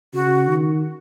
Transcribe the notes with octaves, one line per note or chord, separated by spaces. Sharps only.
C#3 F#4
D#3